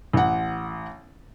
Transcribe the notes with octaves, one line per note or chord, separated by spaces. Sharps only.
A1 F#5